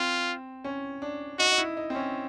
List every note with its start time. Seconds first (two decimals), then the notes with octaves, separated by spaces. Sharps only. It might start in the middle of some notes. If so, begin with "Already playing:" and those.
Already playing: C4 F4
0.64 C#4
1.02 D4
1.39 D#4 F#4
1.52 D#4
1.58 E4
1.77 D#4
1.90 C4
1.95 C#4